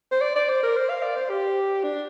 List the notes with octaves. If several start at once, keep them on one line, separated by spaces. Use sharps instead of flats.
C5
D5
D5
C5
A#4
C5
F5
D5
C5
G4
D4